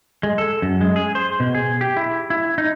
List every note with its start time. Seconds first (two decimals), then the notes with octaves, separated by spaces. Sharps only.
0.23 G#3
0.38 A4
0.62 F#2
0.81 G#3
0.96 G#4
1.15 C5
1.40 B2
1.54 G#4
1.81 G4
1.97 E4
2.30 E4
2.58 D#4